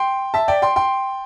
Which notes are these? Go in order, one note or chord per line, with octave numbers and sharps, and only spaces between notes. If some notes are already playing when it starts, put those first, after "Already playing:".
Already playing: G5 C6
E5 A5
D5 G5
G5 C6
G5 C6